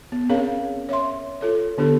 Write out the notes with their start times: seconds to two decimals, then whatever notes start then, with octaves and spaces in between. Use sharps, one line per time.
0.12 B3
0.29 C4 C#4 G#4 A#4 C#5 F5
0.89 C#5 E5 C6
1.41 F4 A4 C#5
1.78 D3 B3 D4 G4 A4